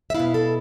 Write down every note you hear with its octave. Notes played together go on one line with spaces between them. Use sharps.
E5
B2 B3 E4 F5
A4